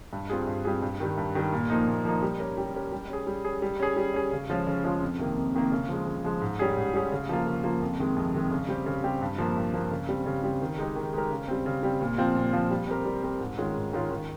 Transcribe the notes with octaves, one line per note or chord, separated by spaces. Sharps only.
G2
G3 C4 F4 G#4
G2
G3 C4 F4 G#4
G2
D#3 G3
G2
D#3 G3
A#2
F3 A#3 D#4
A#2
F3 A#3 D#4
G3
C#4 G4 A#4
G3
C#4 G4 A#4
G3
C#4 G#4
G3
C#4 G#4
G3
C#4 G#4
G3
C#4 G#4
C#3
F3 G#3 C#4 F4
C#3
F3 G#3 C#4 F4
F2
C3 D#3 A#3
F2
C3 D#3 A#3
C#3
F3 G#3
C#3
F3 G#3
G#2
G3 C#4 G#4
G#2
G3 C#4 G#4
C#3
F3 A#3 F4
C#3
F3 A#3 F4
F2
C3 D#3 G#3
F2
C3 D#3 G#3
C#3
G3 C4 G4
C#3
G3 C4 G4
G2
F3 A#3
G2
F3 A#3
C#3
G3 C4
C#3
G3 C4
D#3
G#3 D#4 G4 A#4
D#3
G#3 D#4 G4 A#4
C#3
G3 C4
C#3
G3 C4
A#2
F3 C4 F4
A#2
F3 C4 F4
G3
C4 G4 A#4
G3
C4 G4 A#4
G#2
D#3 G#3 C#4 F4
G#2
D#3 G#3 C#4 F4
D#3